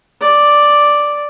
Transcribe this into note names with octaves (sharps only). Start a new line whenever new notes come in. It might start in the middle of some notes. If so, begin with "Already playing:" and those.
D5